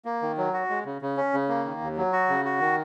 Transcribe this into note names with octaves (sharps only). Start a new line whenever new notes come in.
A#3
D#3
F#3
F#4
G#3
C#3
C#3
C#4
C#3
A#3
D#3
D#2
F#3
F#4
C#3
F#4
D#3